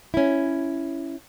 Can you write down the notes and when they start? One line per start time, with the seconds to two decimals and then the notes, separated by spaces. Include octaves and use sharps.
0.14 C#4 E4